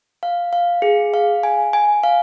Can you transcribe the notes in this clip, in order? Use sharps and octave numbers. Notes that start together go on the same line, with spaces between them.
F5
F5
G#4
F5
G#5
G#5
F5